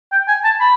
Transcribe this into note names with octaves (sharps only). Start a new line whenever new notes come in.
G5
G#5
A5
B5